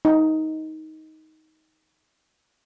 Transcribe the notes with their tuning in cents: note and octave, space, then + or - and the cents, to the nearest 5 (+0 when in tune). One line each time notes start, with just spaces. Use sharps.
D#4 +15